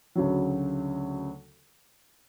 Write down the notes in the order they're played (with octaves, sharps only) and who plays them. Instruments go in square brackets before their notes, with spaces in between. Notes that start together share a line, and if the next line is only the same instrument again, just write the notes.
[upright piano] D2 C#3 F#3